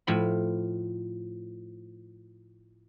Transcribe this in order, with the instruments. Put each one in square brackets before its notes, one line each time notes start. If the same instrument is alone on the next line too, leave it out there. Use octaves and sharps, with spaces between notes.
[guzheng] A2 F3 B5